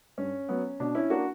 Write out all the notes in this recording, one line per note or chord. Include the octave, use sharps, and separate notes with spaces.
G2 C#4
F#3 B3
B2 D4
C#4 E4
A#3 D4 F#4